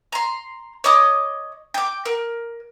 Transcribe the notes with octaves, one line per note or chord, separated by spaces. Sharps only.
A#5 C6
C#5 D#5 D6 D#6
G5 D6
A#4